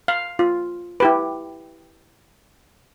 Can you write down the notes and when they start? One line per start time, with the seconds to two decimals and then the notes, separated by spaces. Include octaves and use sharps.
0.08 F5
0.39 F4
1.00 E4 G4 B4